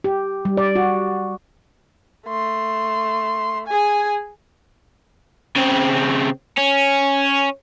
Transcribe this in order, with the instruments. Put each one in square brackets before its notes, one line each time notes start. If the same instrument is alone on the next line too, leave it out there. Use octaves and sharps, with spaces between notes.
[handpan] G4
G3
D5
F#4
[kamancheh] A3 C6
G#4 G#5
[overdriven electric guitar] C#3 C4
C#4